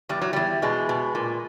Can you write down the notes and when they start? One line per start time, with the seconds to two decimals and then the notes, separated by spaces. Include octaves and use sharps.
0.09 E2 G3
0.22 F#3
0.33 E2 G3
0.62 B2 G#3
0.89 B2
1.15 A#2